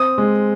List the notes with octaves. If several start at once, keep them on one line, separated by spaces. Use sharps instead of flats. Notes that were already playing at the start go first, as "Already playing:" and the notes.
Already playing: C4 D#6
G#3